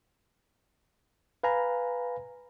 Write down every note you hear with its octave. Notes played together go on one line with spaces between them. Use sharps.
B4 F5 G#5 A#5 B5